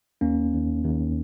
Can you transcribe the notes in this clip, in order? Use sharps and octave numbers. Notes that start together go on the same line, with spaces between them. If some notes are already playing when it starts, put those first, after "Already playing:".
D#2 A#3 C#4
D#2
D#2